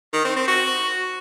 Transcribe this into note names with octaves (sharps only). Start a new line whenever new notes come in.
D#3
C4
C4
F#4